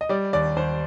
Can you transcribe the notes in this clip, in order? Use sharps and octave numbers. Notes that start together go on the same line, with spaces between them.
D#5
G3 D5
D#2 D5
D#2 C5